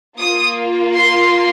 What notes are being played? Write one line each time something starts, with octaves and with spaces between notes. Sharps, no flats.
A#3 F4 D#6
C6